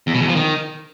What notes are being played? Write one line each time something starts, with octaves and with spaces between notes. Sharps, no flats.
E2
B2
E2
F3
D#3